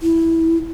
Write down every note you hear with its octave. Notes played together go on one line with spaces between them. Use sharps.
E4